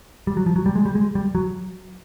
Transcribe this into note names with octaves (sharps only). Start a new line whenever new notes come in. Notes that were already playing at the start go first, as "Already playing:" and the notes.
G3
F#3
F3
F#3
G3
G#3
G3
G#3
G3
F#3